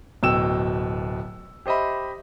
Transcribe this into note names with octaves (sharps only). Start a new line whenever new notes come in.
D1 B2 G5 E6 E7
G4 C5 D#5 E5 B5